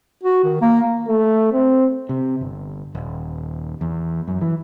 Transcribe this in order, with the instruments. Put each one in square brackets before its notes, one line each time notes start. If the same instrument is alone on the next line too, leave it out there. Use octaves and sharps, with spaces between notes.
[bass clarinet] F#4
D#3
A#3
[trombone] A3
C4
[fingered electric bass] C3
G1
D#1
E2
F#2
E3